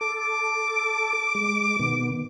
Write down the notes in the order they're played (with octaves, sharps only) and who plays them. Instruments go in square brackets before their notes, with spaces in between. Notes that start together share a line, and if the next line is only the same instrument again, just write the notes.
[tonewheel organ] A4 [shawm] D6
[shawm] D6
[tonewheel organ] G#3
B2 D#3 B3